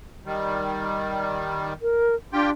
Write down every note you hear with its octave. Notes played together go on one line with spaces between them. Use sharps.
D#3 G3
A#4
D4 F4 G4 G5